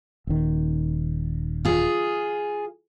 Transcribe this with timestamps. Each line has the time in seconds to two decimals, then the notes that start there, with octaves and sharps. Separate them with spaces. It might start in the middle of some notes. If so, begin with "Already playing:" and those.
0.27 D#1 D#3
1.65 F4 G#4